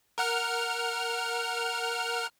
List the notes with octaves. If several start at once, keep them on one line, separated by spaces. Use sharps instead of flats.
A#4 F#5 F6